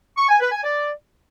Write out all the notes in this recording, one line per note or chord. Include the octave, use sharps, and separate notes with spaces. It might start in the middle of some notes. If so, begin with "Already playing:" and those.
C#6
G#5
B4
G#5
D5